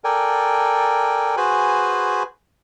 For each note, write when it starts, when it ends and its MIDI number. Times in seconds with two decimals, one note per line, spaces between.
0.04 1.36 69
0.04 1.36 70
0.04 1.36 74
0.04 1.36 79
0.04 1.36 80
1.37 2.23 66
1.37 2.23 68
1.37 2.23 71
1.37 2.23 72
1.37 2.23 80
1.37 2.23 83